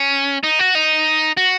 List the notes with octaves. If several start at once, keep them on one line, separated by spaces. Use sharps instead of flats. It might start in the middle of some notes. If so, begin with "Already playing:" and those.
Already playing: C#4
D#4
F#4
D#4
F#4